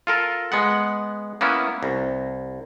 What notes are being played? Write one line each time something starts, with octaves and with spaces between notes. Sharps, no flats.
F4 A4 A#4
G#3 B3 F#5
A#3 B3 C#4 E4
C2